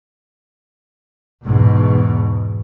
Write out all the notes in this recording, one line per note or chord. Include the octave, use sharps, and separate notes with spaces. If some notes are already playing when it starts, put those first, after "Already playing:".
E2 G#2 B2